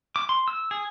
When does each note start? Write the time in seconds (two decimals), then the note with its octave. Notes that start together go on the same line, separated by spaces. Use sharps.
0.16 D6
0.29 C6
0.48 E6
0.71 G#4